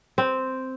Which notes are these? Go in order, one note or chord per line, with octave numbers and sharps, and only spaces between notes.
C4